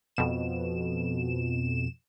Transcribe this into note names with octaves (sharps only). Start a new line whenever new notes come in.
F2 B2 E7